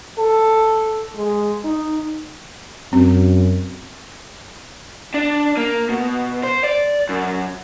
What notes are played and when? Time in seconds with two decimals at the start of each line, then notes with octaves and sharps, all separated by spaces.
0.19 A4
1.16 G#3
1.64 D#4
2.93 F#2 C4
5.14 D4
5.57 A#3
5.89 B2
6.43 C5
6.64 D5
7.09 F#2